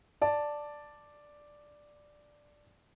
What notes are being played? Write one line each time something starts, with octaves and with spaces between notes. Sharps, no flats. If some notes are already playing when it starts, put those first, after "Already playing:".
D5 A5